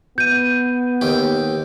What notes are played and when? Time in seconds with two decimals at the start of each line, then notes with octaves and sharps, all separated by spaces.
0.18 B3 G6 D#7
1.01 D#2 G4